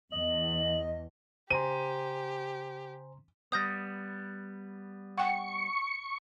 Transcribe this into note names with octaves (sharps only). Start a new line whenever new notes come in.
E2 D#5 F#7
C#3 G4 C5 G#5 A#5 C6 D#7
G3 B3 D#6 G6 A#6
F#5 G5 C#6